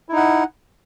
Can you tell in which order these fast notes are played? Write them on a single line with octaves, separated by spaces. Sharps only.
E4 D#4 F#5